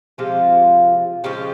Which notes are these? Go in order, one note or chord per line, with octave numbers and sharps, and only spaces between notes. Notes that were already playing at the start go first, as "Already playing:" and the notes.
C3 F3 G#3 F4
C#3 F3 G#3 G4